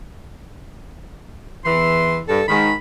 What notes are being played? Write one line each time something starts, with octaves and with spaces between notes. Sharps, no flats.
E2 E3 C6
G2 A4
G#2 D#3 B5